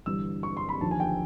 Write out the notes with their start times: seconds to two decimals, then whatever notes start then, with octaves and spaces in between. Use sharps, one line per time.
0.06 G1 G2 E3 E6
0.43 C#6
0.57 C6
0.69 B5
0.81 D#2 D3 F3 A5
0.91 G#5
1.00 G5